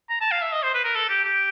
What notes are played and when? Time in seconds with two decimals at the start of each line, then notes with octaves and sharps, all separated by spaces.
0.10 A#5
0.21 A5
0.31 F5
0.42 E5
0.52 D#5
0.63 C5
0.74 B4
0.84 A#4
0.95 A4
1.09 G4
1.24 G4